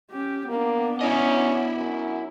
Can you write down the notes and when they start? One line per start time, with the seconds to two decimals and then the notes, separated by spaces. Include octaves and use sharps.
0.11 C#4 G4
0.49 A#3 B3 D4
1.01 C#4 E4 D#5
1.76 F#2